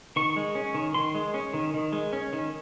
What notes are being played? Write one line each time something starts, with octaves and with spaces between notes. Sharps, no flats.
D#3 C#6
G#3
C#4
D#3
D#3 C6
G#3
C#4
D#3
D#3
G#3
C#4
D#3